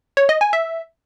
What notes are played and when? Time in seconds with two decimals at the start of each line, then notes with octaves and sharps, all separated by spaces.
0.17 C#5
0.29 D#5
0.41 G#5
0.53 E5